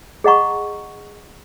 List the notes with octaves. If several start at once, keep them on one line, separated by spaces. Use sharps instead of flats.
G#4 D#5 F#5 A#5 C#6